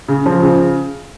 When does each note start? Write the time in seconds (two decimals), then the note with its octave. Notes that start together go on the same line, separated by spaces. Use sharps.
0.08 C#3
0.26 F3
0.42 C#3